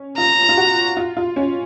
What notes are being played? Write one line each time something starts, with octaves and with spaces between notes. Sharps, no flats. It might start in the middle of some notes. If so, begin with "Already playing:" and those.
Already playing: C#4
F4 A#5
F4
F#4
F4
F4
C#4